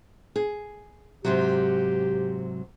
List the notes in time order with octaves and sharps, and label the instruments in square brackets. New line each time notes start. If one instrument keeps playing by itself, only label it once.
[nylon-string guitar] G#4
[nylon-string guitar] G#2 C3 F#3 [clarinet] G4